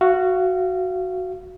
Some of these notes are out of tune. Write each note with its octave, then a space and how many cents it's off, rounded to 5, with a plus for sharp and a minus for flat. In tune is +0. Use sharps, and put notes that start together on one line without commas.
F#4 +0 F5 -30